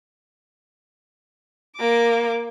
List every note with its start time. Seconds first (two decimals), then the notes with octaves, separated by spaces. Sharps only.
1.77 A#3 D6